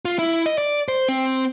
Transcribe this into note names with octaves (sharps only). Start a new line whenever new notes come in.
F4
E4
D#5
D5
C5
C4